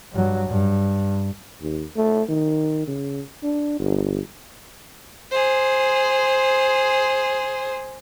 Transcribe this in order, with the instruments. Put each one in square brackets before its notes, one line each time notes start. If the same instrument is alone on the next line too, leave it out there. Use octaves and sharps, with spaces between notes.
[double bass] G2 F#3
G2
[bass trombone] D#2
A3
D#3
C#3
D4
G1
[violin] G#4 C5